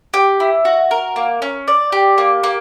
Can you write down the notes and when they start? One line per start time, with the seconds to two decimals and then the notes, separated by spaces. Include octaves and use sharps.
0.14 G4
0.40 E4
0.65 F#4
0.91 A#4
1.16 A#3
1.42 C#4
1.68 D5
1.92 G4
2.18 A#3
2.43 A#3